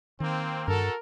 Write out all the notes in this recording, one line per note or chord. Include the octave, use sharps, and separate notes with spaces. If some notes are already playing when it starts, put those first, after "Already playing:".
D#3 A#3 C4
G2 F#4 A4 A#4